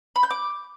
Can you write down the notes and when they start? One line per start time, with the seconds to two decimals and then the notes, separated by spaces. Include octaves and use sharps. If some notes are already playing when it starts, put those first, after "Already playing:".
0.16 B5
0.23 G6
0.30 D6